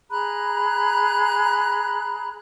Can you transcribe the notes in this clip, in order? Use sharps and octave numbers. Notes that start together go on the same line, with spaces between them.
G#4 A#5 B5 F#6